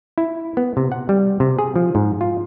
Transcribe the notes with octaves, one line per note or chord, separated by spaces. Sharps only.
E4
B3
C3
F#5
G3
C3
G#4
F3
G#2
F4